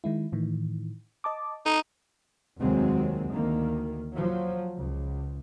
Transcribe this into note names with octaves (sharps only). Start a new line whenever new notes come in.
D#3 G#3 E4
A2 D#3 E3
D#5 A5 D6
D#4 A4
F1 D#2 F#3 G#3 C4
D2 D#3 A#3
F3 F#3
C#2